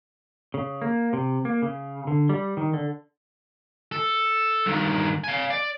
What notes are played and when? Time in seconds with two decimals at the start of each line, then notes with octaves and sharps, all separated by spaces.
0.54 C#3
0.82 A#3
1.13 C3
1.45 A#3
1.62 C#3
2.07 D3
2.29 G3
2.57 D#3
2.73 D3
3.92 A4
4.66 G2 D#3
5.24 F5 G#5
5.50 D5